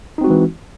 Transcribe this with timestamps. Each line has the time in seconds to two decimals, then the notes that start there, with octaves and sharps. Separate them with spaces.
0.18 D#4
0.21 C4
0.24 F#4
0.27 G#3
0.30 E3